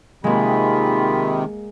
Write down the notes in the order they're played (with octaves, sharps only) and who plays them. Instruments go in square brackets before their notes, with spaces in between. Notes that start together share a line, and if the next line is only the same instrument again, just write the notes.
[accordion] C3 D#3 [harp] G#3 A#3 [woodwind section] F4 B5